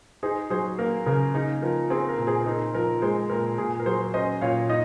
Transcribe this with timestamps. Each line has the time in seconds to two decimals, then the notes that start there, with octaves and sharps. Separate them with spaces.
0.23 D#4 G#4 C5
0.50 F#3 G#4 C5
0.79 A#3 A#4
1.06 C#3 A#4
1.34 D#4 G#4
1.62 F3 A#4
1.90 C4 G#4
2.09 A#4
2.18 A#2
2.27 G#4 C5
2.46 D#4 A#4
2.74 F3 A#4
3.02 G#3 G#4 C5
3.30 A#2 A#4
3.58 A#2 G#4
3.80 A#4
3.86 F#3 G#4 C5
4.14 C#4 C5 D#5
4.41 A#2 C#5 F5
4.69 D#4 D#5